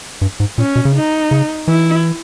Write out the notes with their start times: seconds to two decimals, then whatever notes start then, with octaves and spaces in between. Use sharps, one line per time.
0.21 G2
0.40 G#2
0.58 A#2 C#4
0.76 B2
0.85 C#3
0.95 D#4
1.31 C#3
1.68 E3 E4